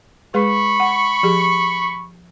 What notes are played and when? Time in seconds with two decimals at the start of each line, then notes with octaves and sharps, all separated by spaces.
0.34 G#3 G#4 B4 B5 C#6
0.80 F#5
1.23 F3 G4 G#4